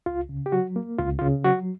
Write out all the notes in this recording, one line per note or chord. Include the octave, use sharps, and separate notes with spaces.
C#2 F4
C#3
G4
F#3 F#4
A#3
C#2 F4
F4
C#3
F#3 F#4